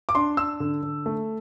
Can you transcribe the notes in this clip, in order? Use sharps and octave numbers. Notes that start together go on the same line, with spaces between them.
D6
D4 C6
D4 E6
D3
D3
A3